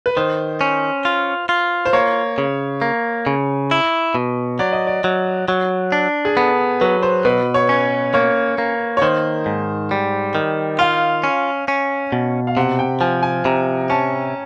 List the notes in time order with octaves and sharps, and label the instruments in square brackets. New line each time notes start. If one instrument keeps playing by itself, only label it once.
[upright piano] B4
[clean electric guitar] D#3 [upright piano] C5
[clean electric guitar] C#4
F4
F4
[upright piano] C5
[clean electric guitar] A#3 [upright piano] C#5
[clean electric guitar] C#3
A#3
C#3
E4
B2
[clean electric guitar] F#3 [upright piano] D5
[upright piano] D#5
D5
[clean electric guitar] F#3
F#3
D4
[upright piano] G#4
[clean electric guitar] B3 [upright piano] A4
[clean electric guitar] F#3 [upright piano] B4
[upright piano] C5
[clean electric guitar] B2 [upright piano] B4
[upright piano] C#5
[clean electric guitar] C#4
[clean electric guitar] A#3 [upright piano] C#5
[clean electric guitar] A#3
[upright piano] C#5
[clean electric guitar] D#3 [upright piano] C5
[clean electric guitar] G#2
G3
D#3
[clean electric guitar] F4 [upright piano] F5
[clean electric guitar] C#4
C#4
B2
[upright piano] F5
[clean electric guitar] C3 [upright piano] F#5
[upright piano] G5
[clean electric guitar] F3 [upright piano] G#5
[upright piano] G#5
[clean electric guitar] C3 [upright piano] A#5
[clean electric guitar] C#4 [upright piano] A5